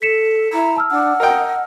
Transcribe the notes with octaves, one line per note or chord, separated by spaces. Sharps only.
A4 B6 C#7 E7
E4 A#5
A5 E6 F6
D4 F#5
A#4 D#5 G5